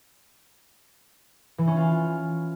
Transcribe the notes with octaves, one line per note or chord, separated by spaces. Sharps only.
E3
C#4
F4